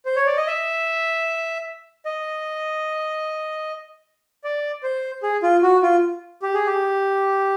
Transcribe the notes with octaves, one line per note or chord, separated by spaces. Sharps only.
C5
C#5
D5
D#5
E5
D#5
D5
C5
G#4
F4
F#4
F4
G4
G#4
G4